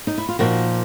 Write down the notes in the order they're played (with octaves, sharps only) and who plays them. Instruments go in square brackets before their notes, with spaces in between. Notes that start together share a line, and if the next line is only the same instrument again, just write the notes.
[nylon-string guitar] D#4
E4
F4
A#2 F3 A#3 D#4 F#4